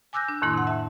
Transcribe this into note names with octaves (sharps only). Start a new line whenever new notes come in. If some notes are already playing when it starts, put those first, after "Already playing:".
G#5 D6 E6 F#6 G6 A#6
D4
F2 A2 D#3 A#3 E4 C6
C3 F#5
E5 A5